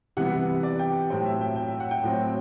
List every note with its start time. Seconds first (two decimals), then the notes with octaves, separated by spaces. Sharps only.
0.17 C3 E3 G3 B3 F#5
0.63 D5
0.79 G5
1.10 A2 F#3 C4 G5
1.26 E5
1.41 G5
1.56 G5
1.68 E5
1.80 F#5
1.91 G5
2.04 A2 F#3 C4